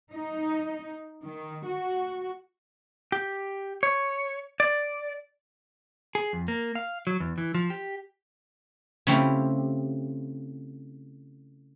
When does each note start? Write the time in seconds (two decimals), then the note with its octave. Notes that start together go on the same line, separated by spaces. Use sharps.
0.13 D#4
1.22 D#3
1.67 F#4
3.12 G4
3.83 C#5
4.60 D5
6.15 G#4
6.33 F2
6.48 A#3
6.75 F5
7.07 F#3
7.20 E2
7.38 E3
7.55 F3
7.70 G4
9.07 C#3 A3 C4 E4 F4 G4